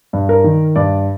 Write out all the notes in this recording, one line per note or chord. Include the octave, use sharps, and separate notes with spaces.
G2
A#4
D#3
G2 D5